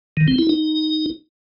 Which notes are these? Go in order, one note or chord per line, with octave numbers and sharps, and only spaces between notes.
D#3
C4
E4
D#4